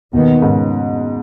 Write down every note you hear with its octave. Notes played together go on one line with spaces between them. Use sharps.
D#2 B2 D#3 B3
G#2 C#3